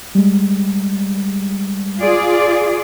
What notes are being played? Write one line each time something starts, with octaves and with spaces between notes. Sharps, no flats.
G3 G#3
F4 G#4 D5